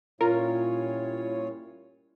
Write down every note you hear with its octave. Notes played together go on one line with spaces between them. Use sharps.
A#2 G3 C#4 E4 F4 A#4 C#5